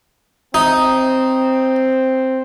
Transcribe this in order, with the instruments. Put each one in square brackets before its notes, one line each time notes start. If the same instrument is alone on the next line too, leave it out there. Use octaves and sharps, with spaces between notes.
[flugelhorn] C4 [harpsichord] D#4